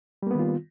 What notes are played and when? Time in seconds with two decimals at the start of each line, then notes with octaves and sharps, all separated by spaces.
0.23 G3
0.27 A#3
0.31 B3
0.35 D#3
0.39 F4